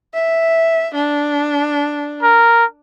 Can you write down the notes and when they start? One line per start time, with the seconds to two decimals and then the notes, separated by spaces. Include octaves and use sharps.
0.14 E5
0.95 D4
2.23 A#4